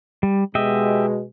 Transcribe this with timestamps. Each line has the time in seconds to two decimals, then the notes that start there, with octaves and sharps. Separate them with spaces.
0.23 G3
0.55 B2 G#3 G4 D#5 E5